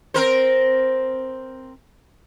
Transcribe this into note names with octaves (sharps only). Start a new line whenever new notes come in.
C4 A#4 C5